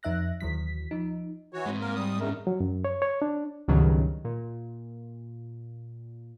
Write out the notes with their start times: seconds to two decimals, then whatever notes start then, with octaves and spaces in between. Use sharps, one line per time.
0.03 F2 D#4 E5 F#6 A#6
0.41 D#2 E3 F#3 B6
0.91 F3 D#4
1.53 E3 F#4 C#5
1.66 G#2 G#3 C4
1.80 A#3 A#4
1.95 G3 D#6
2.20 E2 G2 G#3 C#4 A#4 E5
2.47 F#3
2.60 F#2
2.85 C#5
3.02 C#5
3.22 D4
3.68 C#2 G2 B2 D#3 F#3
4.25 A#2